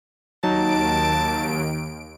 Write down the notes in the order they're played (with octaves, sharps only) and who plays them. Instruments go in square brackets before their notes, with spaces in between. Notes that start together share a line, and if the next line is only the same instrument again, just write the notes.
[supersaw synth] D#2 D7 [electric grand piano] F#3 D#4 [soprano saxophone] A5